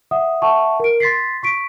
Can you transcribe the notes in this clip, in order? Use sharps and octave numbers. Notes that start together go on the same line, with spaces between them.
E5 F#5 D#6
E5 F#5 A5 C#6
A#4 D7
C6 A6 B6 C7
C#6 B6 D7